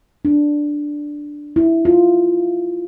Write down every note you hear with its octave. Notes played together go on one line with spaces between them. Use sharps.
D4
E4
F4